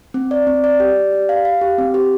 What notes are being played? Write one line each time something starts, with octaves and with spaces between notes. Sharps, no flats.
C4
D5
C4
D5
G4
D5
G4
F5
F5
G4
C4
G4